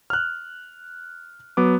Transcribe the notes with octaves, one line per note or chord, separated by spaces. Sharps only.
F6 F#6
F#3 B3 D6